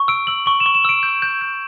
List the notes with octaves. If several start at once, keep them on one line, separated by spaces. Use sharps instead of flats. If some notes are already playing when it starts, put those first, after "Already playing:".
Already playing: C#6
E6 D7
E6 F#7
C#6 F#7
E7
C#6
E7
E6 D7
G6
G6
G6